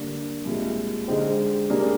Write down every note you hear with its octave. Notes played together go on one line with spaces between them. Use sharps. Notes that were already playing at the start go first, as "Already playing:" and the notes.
Already playing: D3 G3 A#3 D4
C2 A#2 F3 G#3
D3 G#3 D#4 G4 C5
C3 G3 A#3 D4 G#4